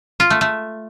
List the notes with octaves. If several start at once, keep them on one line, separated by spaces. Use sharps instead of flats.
F4
A3
A3